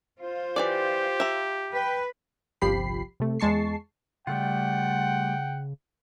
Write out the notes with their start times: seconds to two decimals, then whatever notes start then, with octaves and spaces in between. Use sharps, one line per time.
0.20 F4 C5
0.56 E3 F#3 G4 D5
1.20 E5 A#5
1.73 B4 G5
2.61 G1 C2 F3 G4 B5 C7
3.20 C3 A3
3.40 E2 G#3 A5 C#6 C7
4.27 C#3 G3 A3 F4 F#5 G5